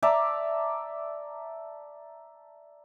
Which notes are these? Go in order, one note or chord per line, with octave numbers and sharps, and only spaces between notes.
D5 E5 A5 A#5